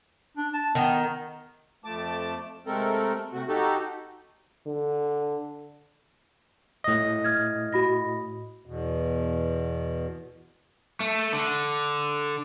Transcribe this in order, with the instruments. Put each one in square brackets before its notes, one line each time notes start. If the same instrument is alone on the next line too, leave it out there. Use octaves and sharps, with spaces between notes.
[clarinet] D4
A5
[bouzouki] D#3 [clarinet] B3
[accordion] F2 F3 A3 A5 D6
C3 G#3 A3 C4 A4 A#4
C3 A3 C4 F#4
D#4 F#4 G4 A4
[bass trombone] D3
[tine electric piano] A2 D#5
[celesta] F6 G#6
F#4 B5 A#6
[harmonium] E2 B2
[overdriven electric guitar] A3
D3